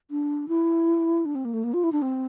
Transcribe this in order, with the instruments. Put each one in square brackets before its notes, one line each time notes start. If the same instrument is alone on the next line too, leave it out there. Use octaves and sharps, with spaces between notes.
[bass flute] D4
E4
D4
C4
A#3
A3
A#3
F4
E4
D4
C4